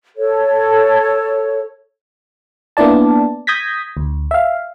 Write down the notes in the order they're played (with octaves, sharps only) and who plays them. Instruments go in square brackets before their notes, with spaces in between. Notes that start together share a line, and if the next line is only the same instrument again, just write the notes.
[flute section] A4 C#5
[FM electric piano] A#3 B3 D4 E4 D5 A5
D#6 G6 G#6 A#6 B6
D2
E5 F5